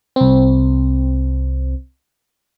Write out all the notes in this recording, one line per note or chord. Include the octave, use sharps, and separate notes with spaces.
C2 C4